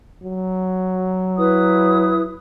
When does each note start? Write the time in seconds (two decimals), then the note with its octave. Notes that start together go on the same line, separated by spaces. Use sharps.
0.23 F#3
1.38 E4 B4 D#6